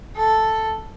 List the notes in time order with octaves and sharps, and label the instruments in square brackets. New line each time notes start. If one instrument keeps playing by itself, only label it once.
[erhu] A4